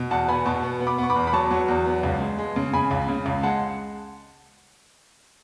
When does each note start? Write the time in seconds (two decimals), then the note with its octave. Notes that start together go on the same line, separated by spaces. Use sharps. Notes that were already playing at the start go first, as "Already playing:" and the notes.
Already playing: B2
0.11 E2 F#5 A5
0.28 B3 G#5 B5
0.46 B2 A5 C#6
0.63 B3
0.80 B3
0.87 B5 D6
0.98 B3 C#6
1.10 B5 D6
1.16 E2
1.27 B5
1.33 F#3 A5 C#6
1.51 F#3
1.68 E2
1.86 B3
2.03 C#2
2.20 G#3
2.38 G#3
2.56 C#3
2.73 C#3 G#5 B5
2.91 C#2
3.08 C#3
3.26 C#2
3.43 G#3 F#5 A5